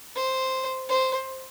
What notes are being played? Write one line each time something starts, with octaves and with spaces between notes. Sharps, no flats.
C5
C5